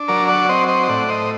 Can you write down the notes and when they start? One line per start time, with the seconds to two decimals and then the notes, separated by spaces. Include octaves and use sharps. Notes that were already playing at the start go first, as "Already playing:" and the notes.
Already playing: D4
0.08 F#3 A#4 D5
0.28 D5 F#5
0.49 C4 C5 D#5
0.68 C5 D#5
0.83 D#5
0.88 A2 D5 F#5
1.09 C5 D#5